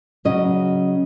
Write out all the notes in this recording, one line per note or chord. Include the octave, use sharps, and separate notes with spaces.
C#3 F#3 C#4 D#5